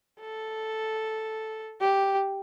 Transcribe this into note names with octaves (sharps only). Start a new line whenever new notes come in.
A4
G4